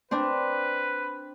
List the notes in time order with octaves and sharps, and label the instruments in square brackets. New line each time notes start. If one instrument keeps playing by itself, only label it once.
[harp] C4 D4 [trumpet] B4